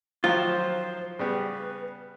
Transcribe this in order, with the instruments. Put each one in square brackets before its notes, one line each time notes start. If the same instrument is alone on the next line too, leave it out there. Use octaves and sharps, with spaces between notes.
[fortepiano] D#3 F3 F#3 [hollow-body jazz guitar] F4 [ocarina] C5
[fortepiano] C#3 G3 B3 [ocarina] B4